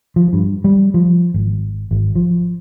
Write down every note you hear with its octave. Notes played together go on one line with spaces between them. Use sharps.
F3
G2
G3
F3
G#1
G#1
F3